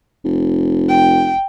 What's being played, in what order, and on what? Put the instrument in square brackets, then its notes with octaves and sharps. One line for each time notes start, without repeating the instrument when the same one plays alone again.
[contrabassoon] F1
[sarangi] G5